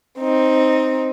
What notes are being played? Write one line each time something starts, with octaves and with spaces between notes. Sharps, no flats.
C4 D#4